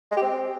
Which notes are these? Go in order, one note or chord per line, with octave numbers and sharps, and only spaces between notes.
G#3
G4
C4